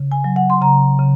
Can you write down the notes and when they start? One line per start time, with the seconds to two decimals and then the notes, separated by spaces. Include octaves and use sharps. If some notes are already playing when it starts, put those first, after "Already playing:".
Already playing: C#3
0.12 G#5
0.24 F#3
0.36 F#5
0.50 C6
0.61 C#3 A#5
0.99 C#3